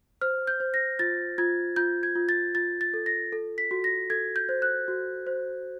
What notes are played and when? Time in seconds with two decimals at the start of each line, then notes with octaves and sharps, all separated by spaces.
0.21 C5 F6
0.47 G6
0.60 C5
0.74 A#6
0.99 F4 A6
1.38 F4 G#6
1.76 F4 G6
2.03 G#6
2.15 F4
2.29 A6
2.55 F4 A6
2.81 A6
2.94 A4
3.06 A#6
3.32 A4
3.58 B6
3.71 F#4
3.84 A#6
4.10 A4 G#6
4.36 G6
4.49 C5
4.62 F#6
4.88 F#4
5.27 C5